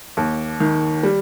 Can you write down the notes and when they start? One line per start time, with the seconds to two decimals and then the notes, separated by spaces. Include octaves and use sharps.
0.17 D#2
0.60 D#3
1.03 G3